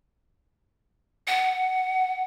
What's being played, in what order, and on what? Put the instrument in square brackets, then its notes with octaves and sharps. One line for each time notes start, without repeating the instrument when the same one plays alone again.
[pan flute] F#5